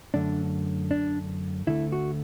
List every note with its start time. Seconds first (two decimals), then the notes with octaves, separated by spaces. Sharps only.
0.14 F#2 D3 A3 D4
0.91 D4
1.67 D2 D3 A3 E4
1.92 F#4